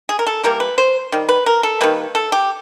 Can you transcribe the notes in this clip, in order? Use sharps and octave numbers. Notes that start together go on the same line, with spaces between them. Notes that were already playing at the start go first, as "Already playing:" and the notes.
G#4
A#4
A4
E3 G3 A#3 A#4
B4
C5
D#3 G3
B4
A#4
A4
D#3 G3 A#3 B4
A4
G4